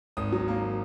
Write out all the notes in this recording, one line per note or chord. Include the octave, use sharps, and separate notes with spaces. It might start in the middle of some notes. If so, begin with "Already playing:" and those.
G#1 D#6
F#3
A#3